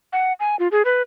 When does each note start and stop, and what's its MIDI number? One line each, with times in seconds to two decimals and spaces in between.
0.13 0.33 78
0.40 0.56 80
0.59 0.68 65
0.72 0.82 68
0.85 1.02 71